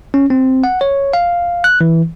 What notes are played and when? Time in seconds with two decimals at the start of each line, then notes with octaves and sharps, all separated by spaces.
0.14 C#4
0.30 C4
0.64 F#5
0.81 C#5
1.13 F5
1.64 F#6
1.81 E3